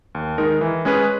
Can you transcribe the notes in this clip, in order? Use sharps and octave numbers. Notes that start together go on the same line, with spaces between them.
D#2
D#3 G#3 D#4 A#4
E3
G#3 C#4 G#4 B4